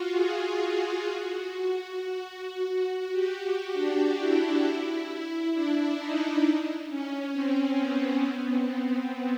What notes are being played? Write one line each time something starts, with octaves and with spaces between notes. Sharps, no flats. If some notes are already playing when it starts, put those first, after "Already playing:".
Already playing: F4 F#4
G#4
F#4
F#4
G4
G4
D4
E4
D4
D#4
C#4
C4
B3
B3
C4
B3